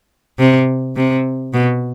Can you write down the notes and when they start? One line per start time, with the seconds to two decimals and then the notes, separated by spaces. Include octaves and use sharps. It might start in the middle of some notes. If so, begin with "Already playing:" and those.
0.39 C3
0.96 C3
1.54 B2